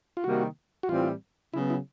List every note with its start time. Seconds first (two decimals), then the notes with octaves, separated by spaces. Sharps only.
0.17 F4
0.24 C3 D#3 G3 A#3 F#4
0.83 F#4
0.89 A2 E3 G3 C4 F4
1.54 C#3 F#3 B3 E4
1.70 E4